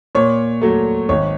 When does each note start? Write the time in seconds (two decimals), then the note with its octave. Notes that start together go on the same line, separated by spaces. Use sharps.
0.15 A#2 C#5
0.62 F#3 A3
1.09 G#1 C#5